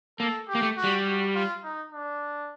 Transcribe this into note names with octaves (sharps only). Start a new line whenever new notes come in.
A#3 A4
G4
A#3
A3
F#4
G3
F#4
F4
D#4
D4